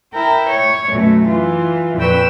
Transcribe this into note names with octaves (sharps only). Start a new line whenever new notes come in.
E4 A#4 G5
C#5
F#2 B2 A3
E3 F4
F2 A#2 B4 G5 C#6 E6